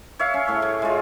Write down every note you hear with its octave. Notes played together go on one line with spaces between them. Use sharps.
C#5 E5 F5
C#4
A2 A3
A2
G#3 F4